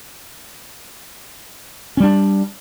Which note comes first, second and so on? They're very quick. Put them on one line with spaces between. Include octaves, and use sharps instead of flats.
C#4 G3 D4